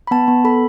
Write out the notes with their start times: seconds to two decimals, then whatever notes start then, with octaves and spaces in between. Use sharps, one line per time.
0.07 B5
0.11 B3 A5
0.28 B3
0.44 A4 B5